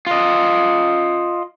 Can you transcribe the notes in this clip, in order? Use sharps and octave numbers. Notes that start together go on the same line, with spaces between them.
F4 D#5